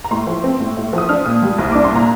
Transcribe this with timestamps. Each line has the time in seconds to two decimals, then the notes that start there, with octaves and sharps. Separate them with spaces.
0.04 A#5
0.11 A2 C6
0.27 F3
0.44 C4
0.60 A2
0.77 A2
0.93 F3 D#6
1.09 D4 F6
1.26 A#2 D#6
1.42 G3
1.58 C2
1.72 D4 D6
1.84 C6
1.92 A#2 A#5